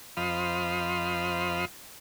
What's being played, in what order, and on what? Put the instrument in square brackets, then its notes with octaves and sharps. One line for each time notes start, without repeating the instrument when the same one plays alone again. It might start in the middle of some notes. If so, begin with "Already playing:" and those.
[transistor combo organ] F2 F3 C5 D#5 F5 B5